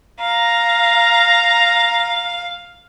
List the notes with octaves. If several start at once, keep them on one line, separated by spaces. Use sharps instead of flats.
F5 A#5